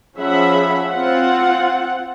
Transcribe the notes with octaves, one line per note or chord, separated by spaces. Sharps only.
F3 C#4 G#4 E5 F#5 B5
C4 F4 F#5